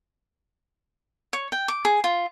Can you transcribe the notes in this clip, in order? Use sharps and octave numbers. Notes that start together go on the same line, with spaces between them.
C#5
G5
D6
G#4
F4